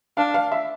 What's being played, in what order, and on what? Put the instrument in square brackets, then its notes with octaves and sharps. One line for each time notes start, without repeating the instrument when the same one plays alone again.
[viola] D4 [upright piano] F5
[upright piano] F5
E5